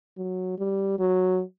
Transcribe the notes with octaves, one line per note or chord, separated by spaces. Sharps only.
F#3
G3
F#3